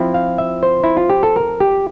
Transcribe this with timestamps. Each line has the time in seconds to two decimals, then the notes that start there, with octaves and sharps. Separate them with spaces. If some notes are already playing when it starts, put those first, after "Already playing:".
Already playing: F3 C4 E4
0.14 F5
0.38 E5
0.63 C5
0.84 E4
0.97 F4
1.10 G4
1.23 A4
1.36 A#4
1.60 G4